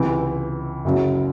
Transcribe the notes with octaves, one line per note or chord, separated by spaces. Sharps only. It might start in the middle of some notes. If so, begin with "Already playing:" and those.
Already playing: C#2 C3 E3
F#1 F#2 C#3 F#3